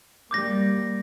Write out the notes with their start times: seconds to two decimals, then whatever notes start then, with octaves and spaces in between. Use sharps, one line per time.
0.31 G3 A#3 D6 G6 A#6